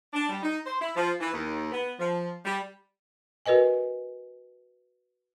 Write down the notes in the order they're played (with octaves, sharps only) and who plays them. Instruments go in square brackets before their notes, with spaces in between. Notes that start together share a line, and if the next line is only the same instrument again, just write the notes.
[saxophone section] D4
G3
D#4
C5
E4
F3
E3
D#2
B3
F3
G3
[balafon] F#4 A#4 B4 D#5 G#5